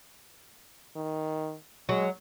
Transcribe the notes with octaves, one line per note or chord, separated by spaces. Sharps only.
D#3
F#3 G#3